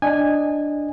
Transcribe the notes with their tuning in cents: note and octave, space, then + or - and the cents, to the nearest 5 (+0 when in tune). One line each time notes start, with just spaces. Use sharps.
D4 +0 D#5 +0 G#5 -15